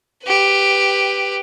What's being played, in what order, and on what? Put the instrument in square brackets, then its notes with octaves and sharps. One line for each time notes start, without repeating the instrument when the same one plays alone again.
[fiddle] G4 B4